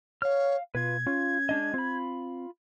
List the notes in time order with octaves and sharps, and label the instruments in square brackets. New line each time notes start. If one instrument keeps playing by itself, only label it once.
[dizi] C#5 [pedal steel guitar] F5 F6
[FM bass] B2 [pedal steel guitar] F4 B4 [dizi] G#6
[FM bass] C#4 [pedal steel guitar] F4
[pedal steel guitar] G#3 D4 D#5
[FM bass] C4 [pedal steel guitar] F4 B5